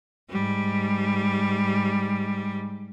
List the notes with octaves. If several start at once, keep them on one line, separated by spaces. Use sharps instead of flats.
G#2 G3